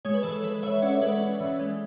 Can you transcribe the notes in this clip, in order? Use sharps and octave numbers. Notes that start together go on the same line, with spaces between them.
G#3 C#5
B4
E3 A4 C#5
E3 B4
E3 C#5 E5
C#4 D5 F#5
C#5 E5
G#3 B4 D5
B4
C#4
E3
G#3